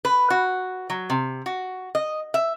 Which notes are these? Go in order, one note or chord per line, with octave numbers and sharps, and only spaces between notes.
B4
F#4
F#3
C3
F#4
D#5
E5